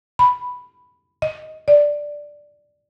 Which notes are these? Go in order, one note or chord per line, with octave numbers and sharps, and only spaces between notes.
B5
D#5
D5